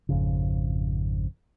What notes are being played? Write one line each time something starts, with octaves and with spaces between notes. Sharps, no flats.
G#1 F2 C#3